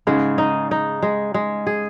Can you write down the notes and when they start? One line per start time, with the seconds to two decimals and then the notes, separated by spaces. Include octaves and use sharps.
0.07 G#2 C#3 G#3
0.38 D#4
0.71 D#4
1.02 G#3
1.34 G#3
1.67 G#4